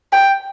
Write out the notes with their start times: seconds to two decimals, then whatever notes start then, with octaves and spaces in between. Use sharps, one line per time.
0.12 G5